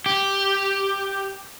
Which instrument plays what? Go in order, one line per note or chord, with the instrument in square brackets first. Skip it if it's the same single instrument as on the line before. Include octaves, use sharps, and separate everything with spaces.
[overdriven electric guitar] G4